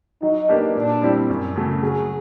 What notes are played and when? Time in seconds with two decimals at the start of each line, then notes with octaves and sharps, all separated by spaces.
0.22 F#3 D#4
0.49 A#3 D4 G4 B4
0.75 A#2 D4
1.02 G3 C4 E4 G4
1.30 F#2
1.56 C#3 F#3 A3
1.83 F#3 G#4